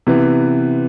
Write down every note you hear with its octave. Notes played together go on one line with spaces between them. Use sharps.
C3 E3 B3